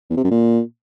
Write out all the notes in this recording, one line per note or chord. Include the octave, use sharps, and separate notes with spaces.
E2
C3
F#2
A#2